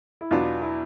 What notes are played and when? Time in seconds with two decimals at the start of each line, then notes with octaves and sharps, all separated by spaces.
0.21 E4
0.31 E2 B2 F#3 B3 D4 F4
0.62 E4